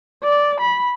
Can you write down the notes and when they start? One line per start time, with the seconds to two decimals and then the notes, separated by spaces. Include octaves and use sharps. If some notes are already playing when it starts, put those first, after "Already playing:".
0.23 D5
0.60 B5